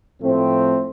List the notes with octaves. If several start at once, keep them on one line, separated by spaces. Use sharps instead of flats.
A2 F3 A3 C4